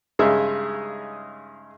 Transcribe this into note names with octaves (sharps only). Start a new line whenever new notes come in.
G2 C#3 G#3 D#4 G#4 E5